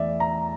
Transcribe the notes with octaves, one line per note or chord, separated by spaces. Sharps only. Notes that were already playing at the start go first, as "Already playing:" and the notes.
Already playing: E2 E3 A3 D5 E5
A#5